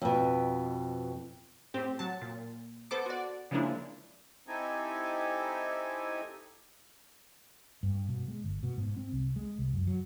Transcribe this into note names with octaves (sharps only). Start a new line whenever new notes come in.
F2 B2
A2 C4 G4
F#3 A5
A#2
B3 A4 C5 A5 D6 D7
F#4 D5
C#3 F3 G#3 A#3 D4 E4
C4 D#4 E4 G4 A4 G#5
G2
B2
G#3
G1
B2
G#2
C4
C2
G#3
C2
F#2
F#3